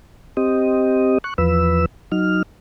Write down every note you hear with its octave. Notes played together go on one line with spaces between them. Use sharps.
C4 G4 D#5
C#6 F#6
E2 F3 B4 E6
F#3 D#4 F6